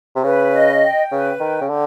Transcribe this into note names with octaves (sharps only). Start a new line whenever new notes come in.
C3
C#3 B4
D#5
G5
C#3 B4
D#3 G5
C#3
D3 G5